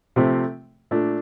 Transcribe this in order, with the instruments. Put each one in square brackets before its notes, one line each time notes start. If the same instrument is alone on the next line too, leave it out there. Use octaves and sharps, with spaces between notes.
[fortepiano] C3 F3 A3 C4
A#2 A3 D4